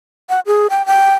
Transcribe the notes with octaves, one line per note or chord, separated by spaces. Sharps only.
F#5
G#4
G5
G5